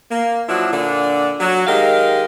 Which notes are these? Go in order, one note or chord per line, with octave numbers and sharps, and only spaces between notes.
A#3
F3 F#3 D4 E4
A#2 D3 D4
F#3
D#3 G#3 G4 A#4 F5